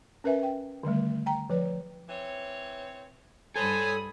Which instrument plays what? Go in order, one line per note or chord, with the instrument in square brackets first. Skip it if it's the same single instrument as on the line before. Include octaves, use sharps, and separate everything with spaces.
[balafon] C#4 A#4 B4 E5 G#5
G5
D3 D#3 G3 A3
G5 A#5
F3 B4 D5
[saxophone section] E3 C4 C#5
[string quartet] G2 B5 D#6 [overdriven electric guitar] A4 [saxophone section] C5 C#5 [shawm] G#5